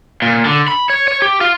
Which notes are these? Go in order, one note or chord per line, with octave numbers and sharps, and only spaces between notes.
A#2
D3
B5
C#5
C#5
G4
F4